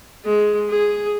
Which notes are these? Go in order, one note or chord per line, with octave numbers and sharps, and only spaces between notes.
G#3
G#4